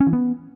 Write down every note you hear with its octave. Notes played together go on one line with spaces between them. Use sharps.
C#4
E3
B3